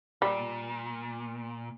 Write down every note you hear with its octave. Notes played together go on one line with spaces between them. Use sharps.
A#2 G3